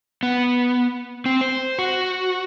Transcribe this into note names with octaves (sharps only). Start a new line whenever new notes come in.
B3
C4
C5
F#4